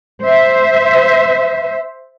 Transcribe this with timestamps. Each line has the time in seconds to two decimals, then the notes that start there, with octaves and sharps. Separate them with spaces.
0.23 C5 E5